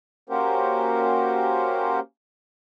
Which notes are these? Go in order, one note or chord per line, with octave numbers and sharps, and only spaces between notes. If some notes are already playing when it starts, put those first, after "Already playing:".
A#3 C#4 F#4 G4 A#4 C5